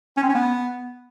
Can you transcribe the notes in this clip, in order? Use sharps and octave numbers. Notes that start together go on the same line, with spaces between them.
C#4
C4
C#4
B3